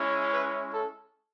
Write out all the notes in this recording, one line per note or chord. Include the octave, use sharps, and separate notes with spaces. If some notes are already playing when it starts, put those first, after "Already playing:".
Already playing: G#3 C#4 E4
B4
A4